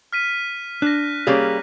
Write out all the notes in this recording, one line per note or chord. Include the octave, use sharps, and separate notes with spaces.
F6 B6 D#7
D4 F#6 A#6
G3 A#3 C#4 G#4 F5